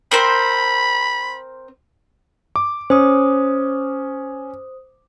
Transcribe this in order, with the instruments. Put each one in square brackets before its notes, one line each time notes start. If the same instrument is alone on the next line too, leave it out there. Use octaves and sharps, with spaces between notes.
[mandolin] C4 A#4 C5 [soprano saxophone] B5
[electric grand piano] D6
[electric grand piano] C#4 [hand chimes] C5 D#6